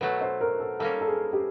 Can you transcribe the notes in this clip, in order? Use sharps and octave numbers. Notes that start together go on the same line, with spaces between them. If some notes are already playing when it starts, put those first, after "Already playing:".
B2 F#3 A3 B4
C5
A#4
A4
G3 A#3 C#4 A4
A4
G#4
G4